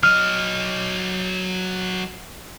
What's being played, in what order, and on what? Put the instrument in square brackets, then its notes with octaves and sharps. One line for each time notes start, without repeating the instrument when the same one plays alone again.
[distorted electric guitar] F#3 D#5 [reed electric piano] F6